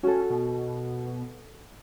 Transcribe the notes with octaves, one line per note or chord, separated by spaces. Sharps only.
C#4 F#4 A4
B2